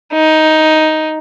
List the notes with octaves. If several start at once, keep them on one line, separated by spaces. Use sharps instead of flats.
D#4